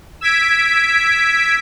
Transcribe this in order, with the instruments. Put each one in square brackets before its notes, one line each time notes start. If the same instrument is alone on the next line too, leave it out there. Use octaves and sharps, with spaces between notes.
[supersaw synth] E6 G#6 B6 D7